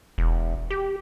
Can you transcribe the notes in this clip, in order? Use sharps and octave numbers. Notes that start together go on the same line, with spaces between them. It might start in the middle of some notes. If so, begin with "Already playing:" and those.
E1
G4